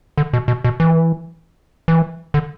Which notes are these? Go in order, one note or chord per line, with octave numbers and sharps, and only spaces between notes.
D3
B2
B2
B2
E3
E3
D3